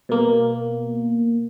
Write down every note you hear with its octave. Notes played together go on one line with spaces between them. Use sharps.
B2 A#3